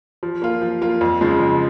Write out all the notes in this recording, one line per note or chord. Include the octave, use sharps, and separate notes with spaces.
F3
A#3 F4
F3
A#3 F4
F2
C#3 F3 G#3
F2